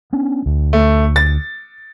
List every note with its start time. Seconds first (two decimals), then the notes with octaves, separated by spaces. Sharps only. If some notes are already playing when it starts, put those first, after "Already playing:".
0.13 B3 C#4 D4
0.46 D2
0.73 A3
1.16 A6